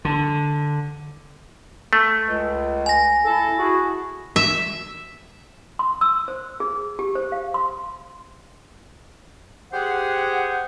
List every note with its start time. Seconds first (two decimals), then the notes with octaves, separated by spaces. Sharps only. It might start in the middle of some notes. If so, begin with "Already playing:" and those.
0.05 D3
1.93 A3
2.26 C#2
2.86 G#5 A#6
3.25 E4 A4
3.59 E4 F#4 G#4
4.36 E5
5.79 C6
6.01 E6
6.28 C5
6.60 G#4
6.99 G4
7.15 C5
7.32 F5
7.54 C6
9.73 G4 G#4 C5 F#5